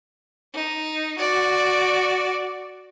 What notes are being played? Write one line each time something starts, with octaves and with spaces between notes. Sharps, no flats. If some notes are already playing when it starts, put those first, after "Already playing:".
D#4
F#4 D5